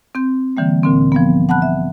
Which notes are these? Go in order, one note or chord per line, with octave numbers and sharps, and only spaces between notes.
C4 G6
D3 E3 G3 A#3
D2 A#2 D3 C4
F3 G3 B3
F#5 A5 B5 F#6
E5